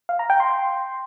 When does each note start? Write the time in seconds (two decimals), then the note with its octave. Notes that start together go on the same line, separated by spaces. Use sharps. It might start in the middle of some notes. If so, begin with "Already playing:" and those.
0.09 F5
0.19 A#5
0.30 G5
0.40 C6